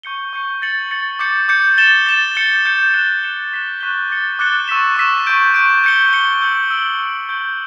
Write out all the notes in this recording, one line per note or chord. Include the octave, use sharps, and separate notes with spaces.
C#6 G6 C#7 G7
C#6 G6 C#7 G7
A6 C#7 F#7
A6 C#7 F#7
D6 G6 C#7
D6 G6 C#7
A6 E7 G7
A6 E7 G7
G6 C#7 G7
G6 C#7 G7
F#6 C#7 E7 G7
F#6 C#7 E7 G7
C#6 F#6 B6 E7 G7
C#6 F#6 B6 E7 G7
D6 F#6 A6 C#7 G7
D6 F#6 A6 C#7 G7
C#6 E6 B6 E7
C#6 E6 B6 E7
C#6 G6 D7
C#6 G6 D7
G6 C#7 G7
G6 C#7 G7
E6 G6 D7 F#7
E6 G6 D7 F#7
C#6 G6 D7 G7
C#6 G6 D7 G7